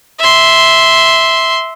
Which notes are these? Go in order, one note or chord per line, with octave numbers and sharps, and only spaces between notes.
E5 C6